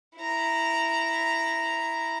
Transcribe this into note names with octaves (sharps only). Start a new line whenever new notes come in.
E4 A#5